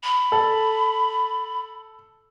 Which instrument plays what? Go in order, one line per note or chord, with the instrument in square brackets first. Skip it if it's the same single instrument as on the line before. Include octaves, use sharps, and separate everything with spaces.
[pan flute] B5
[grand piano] A4